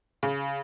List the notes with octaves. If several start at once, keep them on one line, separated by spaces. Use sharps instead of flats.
C#3